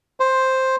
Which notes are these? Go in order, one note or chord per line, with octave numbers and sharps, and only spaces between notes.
C5